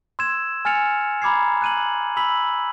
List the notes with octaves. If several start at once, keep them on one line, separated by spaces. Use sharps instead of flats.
C6 E6 G#6 E7
G#5 F6 A6 C#7 F7
A#5 B5 D6 G#6 C7
F#6 D#7 F#7
B5 E6 B6 F#7